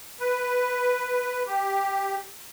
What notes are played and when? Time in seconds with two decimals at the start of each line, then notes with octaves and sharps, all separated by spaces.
0.20 B4
1.47 G4